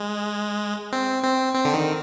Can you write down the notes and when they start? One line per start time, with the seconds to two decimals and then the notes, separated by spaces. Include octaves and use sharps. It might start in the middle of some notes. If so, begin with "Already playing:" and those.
Already playing: G#3
0.92 C4
1.23 C4
1.54 C4
1.65 D3
1.74 D#3